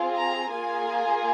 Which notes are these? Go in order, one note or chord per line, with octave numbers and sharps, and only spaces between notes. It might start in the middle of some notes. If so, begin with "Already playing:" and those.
Already playing: C4 F4 G#4
A#5
A#3 F4 G#4 G#5